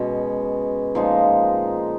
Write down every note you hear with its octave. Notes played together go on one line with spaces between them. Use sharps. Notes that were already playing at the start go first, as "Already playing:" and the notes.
Already playing: B2 G#3 C#4
A#2 F3 G#3 D#4